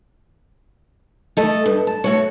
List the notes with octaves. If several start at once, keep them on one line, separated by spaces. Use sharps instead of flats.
A3 A4 D#5
G2
A5
A3 F#4 C#5